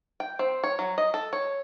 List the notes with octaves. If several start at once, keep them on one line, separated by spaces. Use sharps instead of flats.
G5
C4
C#5
F#3
D#5
A4
C#5